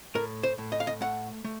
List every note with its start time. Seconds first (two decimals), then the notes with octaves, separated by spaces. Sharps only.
0.15 A2 A#4
0.43 C5
0.58 A2
0.72 D#5
0.80 F5
0.87 D#5
1.01 A3 F#5
1.44 A3